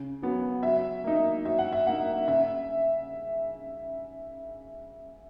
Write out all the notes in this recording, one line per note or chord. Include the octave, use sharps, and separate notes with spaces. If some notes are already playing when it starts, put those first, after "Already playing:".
Already playing: C#3
F#3 B3
F#3 E5
A#3 D#4
F#3 E5
F#5
E5
A#3 D#4 F#5
C#3 E5